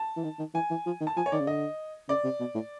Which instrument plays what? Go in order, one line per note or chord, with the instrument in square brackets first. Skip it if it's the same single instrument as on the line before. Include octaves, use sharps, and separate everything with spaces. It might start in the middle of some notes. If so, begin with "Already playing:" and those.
Already playing: [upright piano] A5
[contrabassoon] E3
D#3
D#3
[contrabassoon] E3 [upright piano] G#5
[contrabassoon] E3
F3
D#3
[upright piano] A5
[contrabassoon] F3 [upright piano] G#5
[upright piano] C#5
[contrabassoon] D#3 [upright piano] D5
[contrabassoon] C#3
[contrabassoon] D3 [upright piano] D#5
[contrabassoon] C#3 [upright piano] D5
[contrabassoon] C3
B2
A2